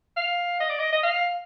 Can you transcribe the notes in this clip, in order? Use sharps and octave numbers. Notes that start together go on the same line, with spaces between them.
F5
D#5
D5
D#5
D#5
F5